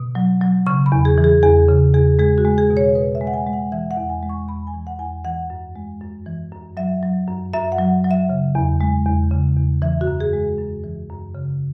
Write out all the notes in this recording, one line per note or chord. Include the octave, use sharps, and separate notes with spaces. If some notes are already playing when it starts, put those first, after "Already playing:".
Already playing: B2
F#3
F#3
C#3 C#6
B5
E2
G#4
E3
G#4
E2 G#4
C#3
E2 G#4
G#3 G#4
F#4
G#3
G#4
B2
C#5
B2 B4
E5
G#3
F#5
G#5
G#3
F#5
E3 E5
F#5
E2
G#5
G#3
C#6
E2 B5
G#5
E3
F#5
E2 G#5
F#5
E3 F#5
F#2
G#3
F#2
E3
F#2
F#3 E5
F#3
F#2
F#2 E5
F#5
F#3
F#3
E5
C#3
E2
G#3
E2
C#3
E2
E3 E5
F#4
F#2
G#4
G#3
F#2
E3
F#2
C#3